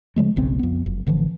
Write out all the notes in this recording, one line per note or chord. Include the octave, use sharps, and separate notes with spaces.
C#3 F3 G#3 A3
F#1 B1 C#3 C4
F2 B3
F#1
A1 D3 E3 F3